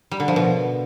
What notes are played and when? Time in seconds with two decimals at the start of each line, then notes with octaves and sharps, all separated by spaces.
0.11 G3
0.20 D3
0.28 F3
0.36 B2